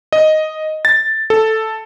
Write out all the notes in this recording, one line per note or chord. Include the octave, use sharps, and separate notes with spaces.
D#5
A6
A4